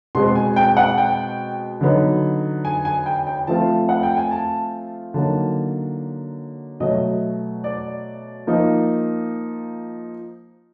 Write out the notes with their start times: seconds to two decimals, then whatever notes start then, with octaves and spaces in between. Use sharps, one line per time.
0.15 B2 G#3 C4 C6
0.35 G#5
0.56 G5
0.77 F#5
0.98 G5
1.81 D3 F#3 B3 D#4
2.65 G#5
2.85 G#5
3.06 G5
3.27 G5
3.47 F3 A3 C4 F4 A5
3.89 F#5
4.03 G5
4.17 G#5
4.31 A5
5.14 D3 F#3 A#3 D#4 A5
6.80 B2 F#3 A3 D#5
7.64 D5
8.47 F3 A#3 D#4